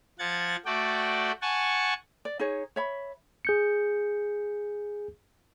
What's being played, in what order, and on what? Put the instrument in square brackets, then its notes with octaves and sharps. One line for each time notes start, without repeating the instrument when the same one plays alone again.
[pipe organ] F3 F#5 G#6 A6
A3 F#4 D5 G5
F#5 G#5 A5 C#6
[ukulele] D5
D#4 G#4 C#5
C#5 E5 B5
[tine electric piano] G#4 G6 C#7